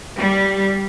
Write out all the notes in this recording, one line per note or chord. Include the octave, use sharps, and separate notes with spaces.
G3